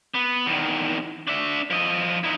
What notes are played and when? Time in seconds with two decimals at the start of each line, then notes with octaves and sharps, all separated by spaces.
0.14 B3
0.46 E2 D#3
1.28 D4 E5
1.70 F3 D#5
2.24 D#4 E4